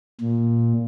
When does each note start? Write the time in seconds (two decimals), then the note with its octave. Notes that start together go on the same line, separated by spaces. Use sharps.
0.21 A#2